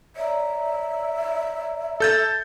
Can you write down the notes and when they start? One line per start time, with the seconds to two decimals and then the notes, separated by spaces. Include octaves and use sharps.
0.16 C#5 D5 E5 A#5
2.00 A4 G6 A6